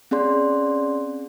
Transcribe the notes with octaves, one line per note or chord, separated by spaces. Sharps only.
C4 C#4 G#4 D5 C6